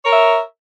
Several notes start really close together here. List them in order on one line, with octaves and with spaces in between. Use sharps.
C#5 A#4 E5